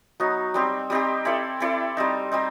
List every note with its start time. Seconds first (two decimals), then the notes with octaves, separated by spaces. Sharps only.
0.20 F#3 B3 D#4
0.54 G3 C4 D#4 G4
0.90 G3 C4 D#4 G4
1.25 C4 E4 A4 D5
1.60 C4 E4 A4 D5
1.97 G3 C4 D#4
2.32 G3 C4 D#4